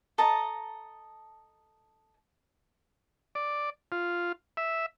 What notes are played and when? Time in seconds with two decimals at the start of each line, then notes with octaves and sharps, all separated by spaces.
0.18 A4 D#5 A5 A#5
3.35 D5
3.92 F4
4.57 E5